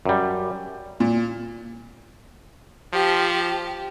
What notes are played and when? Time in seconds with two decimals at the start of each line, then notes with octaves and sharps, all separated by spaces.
0.05 F#2 G3
1.00 A#2
2.93 F3 G4